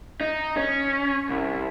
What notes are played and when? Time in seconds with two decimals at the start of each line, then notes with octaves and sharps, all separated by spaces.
0.21 D#4
0.57 C#4
1.29 C2